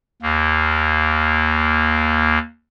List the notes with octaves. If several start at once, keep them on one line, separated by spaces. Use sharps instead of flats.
D#2 A#3